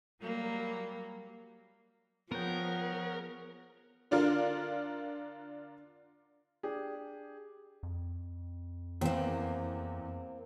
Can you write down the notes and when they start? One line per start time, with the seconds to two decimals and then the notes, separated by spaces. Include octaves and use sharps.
0.21 F#3 G3 A#3
2.32 F3 B3 G#4 A#4 C#5 F#5 G5
4.11 D3 D4 F4 A#4
6.63 D4 G4 G#4
7.83 F2
9.01 E2 A#3 C4